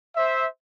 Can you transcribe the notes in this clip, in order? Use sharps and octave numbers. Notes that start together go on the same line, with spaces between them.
C5 E5